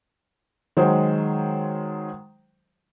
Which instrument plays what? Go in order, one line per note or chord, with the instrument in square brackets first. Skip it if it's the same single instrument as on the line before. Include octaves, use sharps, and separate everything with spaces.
[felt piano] D#3 F#3 G#3 C5